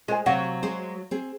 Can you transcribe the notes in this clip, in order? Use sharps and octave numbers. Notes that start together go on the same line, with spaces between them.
G#3 F4 C5 G#5
C3 F#3 F5 F#5
G#3 G#4 C5
C4 G#4